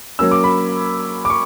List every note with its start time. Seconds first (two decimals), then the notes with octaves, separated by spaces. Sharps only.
0.19 F#3 A#3 C#4 E6
0.31 D6
0.44 B5
1.25 D6
1.30 C#6